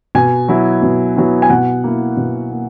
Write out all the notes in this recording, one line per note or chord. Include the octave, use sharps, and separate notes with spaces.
B2 G#5
F#3 B3 E4
B2
F#3 B3 E4
G#5
B2 F#5
A#3 E4
B2
A#3